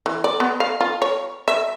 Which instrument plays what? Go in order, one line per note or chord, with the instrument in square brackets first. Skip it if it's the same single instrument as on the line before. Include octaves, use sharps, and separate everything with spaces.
[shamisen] E3
D5
B3
F5
F4
C#5
E5